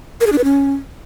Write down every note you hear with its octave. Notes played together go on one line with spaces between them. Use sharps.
A#4
G#4
D4
B4
C#4